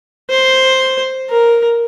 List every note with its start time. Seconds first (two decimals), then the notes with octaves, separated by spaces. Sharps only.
0.30 C5
1.30 A#4